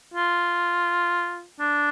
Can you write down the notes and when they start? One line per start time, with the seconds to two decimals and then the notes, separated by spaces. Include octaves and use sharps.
0.14 F4
1.60 D4